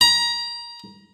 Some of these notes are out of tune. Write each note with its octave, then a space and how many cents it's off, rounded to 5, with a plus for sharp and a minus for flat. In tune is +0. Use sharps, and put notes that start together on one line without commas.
A#5 +25